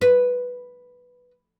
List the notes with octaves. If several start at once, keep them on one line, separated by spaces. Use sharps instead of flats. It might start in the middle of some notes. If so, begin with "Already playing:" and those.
B4